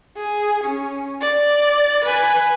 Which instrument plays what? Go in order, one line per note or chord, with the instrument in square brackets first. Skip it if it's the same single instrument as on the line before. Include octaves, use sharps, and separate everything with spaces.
[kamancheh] G#4
C#4
D5
B4 G#5